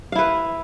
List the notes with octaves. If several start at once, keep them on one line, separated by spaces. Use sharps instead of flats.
E4 B4 F5